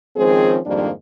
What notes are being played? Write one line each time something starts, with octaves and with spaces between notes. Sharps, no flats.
D#3 F3 G#3 C4 C#4 G#4
F2 G#2 D#3 G3 A#3 D4